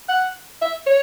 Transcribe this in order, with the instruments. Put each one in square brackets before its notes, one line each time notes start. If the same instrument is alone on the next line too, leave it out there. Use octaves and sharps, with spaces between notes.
[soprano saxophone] F#5
E5
C#5